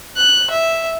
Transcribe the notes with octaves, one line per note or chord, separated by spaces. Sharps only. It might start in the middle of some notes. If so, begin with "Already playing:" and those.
F#6
E5